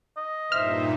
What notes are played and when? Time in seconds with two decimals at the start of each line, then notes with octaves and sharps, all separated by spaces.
0.17 D#5
0.52 G2 A#2 D#4 C5 E5 F6